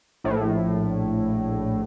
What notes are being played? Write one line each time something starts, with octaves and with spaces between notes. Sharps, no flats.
A#1 A2